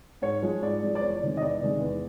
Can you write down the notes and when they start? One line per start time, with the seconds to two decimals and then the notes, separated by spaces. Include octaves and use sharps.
0.22 G#2 C#5
0.42 F3 G#3
0.62 G#2 D5
0.82 F3 G#3
0.95 D5
1.01 E2 C#5
1.22 C3 D#3 G#3
1.37 D#5
1.41 E2 D5
1.61 C3 D#3 G#3
1.81 E2